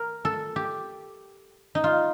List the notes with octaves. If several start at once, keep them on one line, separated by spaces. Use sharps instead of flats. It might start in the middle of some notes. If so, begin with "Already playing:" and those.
Already playing: A#4
A4
G4
D#4
F4